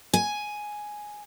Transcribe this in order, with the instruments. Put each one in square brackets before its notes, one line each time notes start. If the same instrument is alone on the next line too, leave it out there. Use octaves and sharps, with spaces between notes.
[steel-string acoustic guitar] G#5